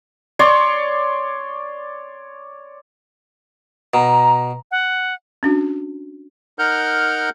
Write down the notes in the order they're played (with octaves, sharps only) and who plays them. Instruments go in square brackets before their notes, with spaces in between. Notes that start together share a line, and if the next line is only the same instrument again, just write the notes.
[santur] C#5 D5 C6 C#6
[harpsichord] B2 [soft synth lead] A#5
[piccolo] F#5
[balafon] C#4 D4 F#4
[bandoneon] D#4 A#4 F#5 F6 G6